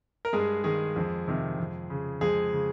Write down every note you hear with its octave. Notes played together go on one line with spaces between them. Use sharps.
A#4
G2 G#3 G#4
D#3 G#3 G#4
F2
C3 D#3
F2
C#3
F2 G#3 G#4
C#3